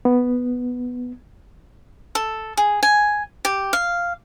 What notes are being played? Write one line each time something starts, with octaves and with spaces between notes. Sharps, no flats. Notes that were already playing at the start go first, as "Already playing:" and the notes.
B3
A4
G#4
G#5
G4
F5